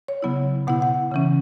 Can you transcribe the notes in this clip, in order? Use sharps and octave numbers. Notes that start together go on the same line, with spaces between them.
C#5
C#3 F#3 B3 E4
B2 B3 E4 F#5
F#5
C#3 E3 C#4